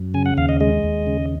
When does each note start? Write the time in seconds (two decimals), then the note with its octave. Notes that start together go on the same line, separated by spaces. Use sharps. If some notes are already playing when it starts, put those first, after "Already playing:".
Already playing: F#2
0.14 C#3 G#5
0.26 F#5
0.37 D#2 F5
0.49 D#5
0.60 G#3 D#5
0.83 D#2
1.07 C#3